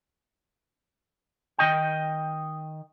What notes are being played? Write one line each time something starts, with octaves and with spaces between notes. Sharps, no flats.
D#3 D#5 G5